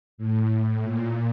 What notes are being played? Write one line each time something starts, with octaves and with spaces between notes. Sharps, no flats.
A2
A#2